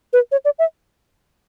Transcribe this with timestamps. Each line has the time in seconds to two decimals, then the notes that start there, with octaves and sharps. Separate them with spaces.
0.13 B4
0.32 C#5
0.45 D5
0.59 E5